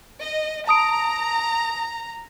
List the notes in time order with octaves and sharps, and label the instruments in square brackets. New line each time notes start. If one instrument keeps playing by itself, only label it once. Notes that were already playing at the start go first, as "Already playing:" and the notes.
[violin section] D#5
[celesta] A5 D#6 D7 [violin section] A#5